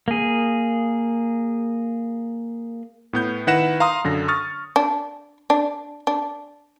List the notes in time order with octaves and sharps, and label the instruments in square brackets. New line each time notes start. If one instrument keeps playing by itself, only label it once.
[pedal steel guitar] A#3 G#4
[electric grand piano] A2 B3 G6
D#3 E4 B4 F#5 A#6 E7
F5 A#5 C6 D#6
F#2 D3 A#6
C#6 D#6 F6 A6
[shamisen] D4
D4
D4